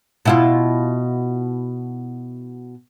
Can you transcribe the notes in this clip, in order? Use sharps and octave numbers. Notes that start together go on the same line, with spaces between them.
B2 E4 F4